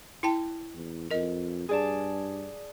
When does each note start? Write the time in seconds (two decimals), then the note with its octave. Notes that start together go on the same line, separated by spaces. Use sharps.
0.23 E4 G5 A5
0.75 E2
1.11 F2 A#4 D#5
1.69 G2 G#4 D5 A5